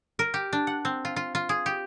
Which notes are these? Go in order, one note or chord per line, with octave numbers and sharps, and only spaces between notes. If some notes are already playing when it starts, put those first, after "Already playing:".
A#4
G4
D4
F#5
C4
F4
F4
F4
G#4
G4